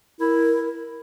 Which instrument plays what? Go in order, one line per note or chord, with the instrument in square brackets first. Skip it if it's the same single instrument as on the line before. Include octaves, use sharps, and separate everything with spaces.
[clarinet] E4 [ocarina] A#4